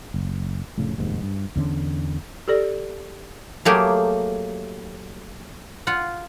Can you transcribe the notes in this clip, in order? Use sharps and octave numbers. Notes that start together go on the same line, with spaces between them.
F#1
F1 A2 C#3
F1 D#2 G#2
G2
E2 D3 C#4
G4 A4 D5
F#3 A3 A#3 G4 G#4
F4 F#5